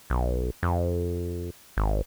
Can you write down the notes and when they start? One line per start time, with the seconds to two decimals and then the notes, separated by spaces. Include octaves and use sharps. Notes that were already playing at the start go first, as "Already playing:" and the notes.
0.10 B1
0.63 F2
1.77 G#1